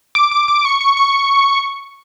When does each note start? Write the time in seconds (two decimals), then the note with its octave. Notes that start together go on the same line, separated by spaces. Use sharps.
0.15 D6
0.31 D6
0.48 D6
0.65 C#6
0.81 C#6
0.97 C#6